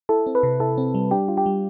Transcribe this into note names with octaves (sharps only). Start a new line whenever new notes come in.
E4 A4
C4
B4
C3
E4 A4
C4
G3
D4 G4
F4
G4
G3